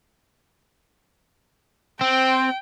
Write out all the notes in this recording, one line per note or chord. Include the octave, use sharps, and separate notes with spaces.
C4 G5